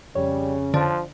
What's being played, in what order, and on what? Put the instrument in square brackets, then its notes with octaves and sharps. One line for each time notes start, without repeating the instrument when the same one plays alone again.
[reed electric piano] F2 C#5 [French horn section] C#3 [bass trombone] G3
[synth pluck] D3 [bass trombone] F3